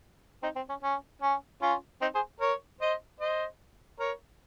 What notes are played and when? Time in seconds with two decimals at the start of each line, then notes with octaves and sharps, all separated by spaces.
0.43 C4 D#4
0.56 C4
0.69 C#4
0.83 C#4
1.22 C#4
1.62 C#4 F4
2.01 C4 D#4
2.15 G#4 C5
2.40 A#4 C#5
2.81 C5 D#5
3.20 C5 D#5
3.99 A#4 C#5